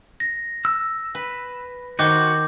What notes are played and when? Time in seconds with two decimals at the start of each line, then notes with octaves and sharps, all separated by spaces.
0.20 A#6
0.65 E6
1.15 B4
1.99 D#3 F#4 C5 D6 G6